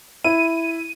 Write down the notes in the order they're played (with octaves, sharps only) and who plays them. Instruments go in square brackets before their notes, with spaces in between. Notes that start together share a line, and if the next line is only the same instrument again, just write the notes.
[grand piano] E4 [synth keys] D#7